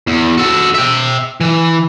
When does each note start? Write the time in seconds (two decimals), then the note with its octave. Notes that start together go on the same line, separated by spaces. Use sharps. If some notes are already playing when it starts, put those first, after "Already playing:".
0.07 E2
0.38 F#4 A4
0.74 E5 G5
1.41 E3